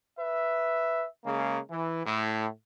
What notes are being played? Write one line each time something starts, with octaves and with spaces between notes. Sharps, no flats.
B4 E5
C#3 G#3 A#3
E3
A2